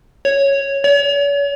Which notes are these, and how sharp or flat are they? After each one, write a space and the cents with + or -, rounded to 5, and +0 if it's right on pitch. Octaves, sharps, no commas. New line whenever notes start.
C#5 -5
C#5 +40